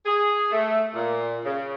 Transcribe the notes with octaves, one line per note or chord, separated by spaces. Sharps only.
G#4
A3
A#2
C#3